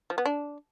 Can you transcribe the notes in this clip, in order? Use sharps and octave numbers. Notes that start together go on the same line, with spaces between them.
F3
B3
D4